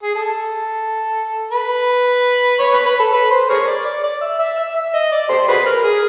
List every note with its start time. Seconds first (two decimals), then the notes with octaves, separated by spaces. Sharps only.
0.03 G#4
0.15 A4
1.51 B4
2.59 C#5
2.73 B4
2.86 B4
3.00 A4
3.13 B4
3.31 C5
3.50 G#4 A#4 C#5
3.67 D5
3.85 D5
4.04 D5
4.21 E5
4.39 E5
4.58 E5
4.75 E5
4.94 D#5
5.12 D5
5.29 G4 A4 C5
5.48 F#4 G#4 B4
5.66 A#4
5.84 G#4